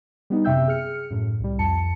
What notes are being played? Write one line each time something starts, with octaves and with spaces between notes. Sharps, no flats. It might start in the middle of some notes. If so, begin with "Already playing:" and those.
G3 B3 D#4
F#2 C3 E5 G5 E6 G6
G#4 F6 C#7
F#2 A2
C2 G3
F2 A5 C#7